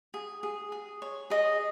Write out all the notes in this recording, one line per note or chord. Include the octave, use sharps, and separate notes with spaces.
G#4
G#4
G#4
C#5
G#4 D#5